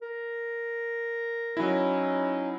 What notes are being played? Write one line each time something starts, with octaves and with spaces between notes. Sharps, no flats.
A#4
F#3 C#4 D#4 E4